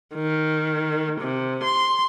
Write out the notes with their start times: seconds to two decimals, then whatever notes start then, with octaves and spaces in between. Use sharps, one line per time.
0.14 D#3
1.19 C3
1.62 C6